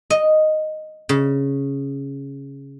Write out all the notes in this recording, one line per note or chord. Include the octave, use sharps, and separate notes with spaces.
D#5
C#3